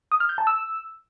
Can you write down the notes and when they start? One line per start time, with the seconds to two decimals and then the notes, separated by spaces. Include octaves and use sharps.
0.12 D#6
0.20 F6
0.29 G6
0.38 A5
0.47 E6